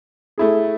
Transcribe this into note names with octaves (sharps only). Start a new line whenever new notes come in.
A3 E4 G#4